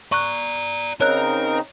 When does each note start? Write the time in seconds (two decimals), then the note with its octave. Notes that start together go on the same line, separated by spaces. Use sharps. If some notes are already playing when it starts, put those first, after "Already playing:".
0.12 D5 A#5 C#6 F#6
1.01 C#3 C4 D#4 A#4 C#5 D#5 F#6